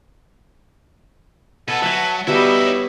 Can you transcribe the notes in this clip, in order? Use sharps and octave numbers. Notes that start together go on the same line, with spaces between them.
B2 A4 B4 F#5 G#5 A5
F#3 B4 E5 G#5
G3 B3 D#4 E4 F#4 E5
C#5